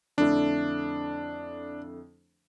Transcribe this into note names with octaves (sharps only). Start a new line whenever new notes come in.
F2 D3 A3 D4 E4